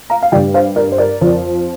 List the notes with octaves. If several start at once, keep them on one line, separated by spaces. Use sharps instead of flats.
F5 A#5
F5
G2 G3 D5 G5
C5 F5
A#4 D5
C5
A#4 D5
F2 F3